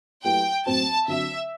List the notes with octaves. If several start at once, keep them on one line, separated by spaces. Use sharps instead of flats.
F#3 A3 E4 G4 B4 G5
A2 F#3 C4 F#4 A5
D3 F#3 C4 F#4 E5